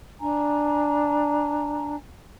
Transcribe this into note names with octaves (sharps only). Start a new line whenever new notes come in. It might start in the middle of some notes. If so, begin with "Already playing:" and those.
D4 G#5 A#5